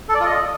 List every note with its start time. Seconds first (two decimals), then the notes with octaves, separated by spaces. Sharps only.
0.09 A4
0.14 D5
0.20 F4
0.26 D#5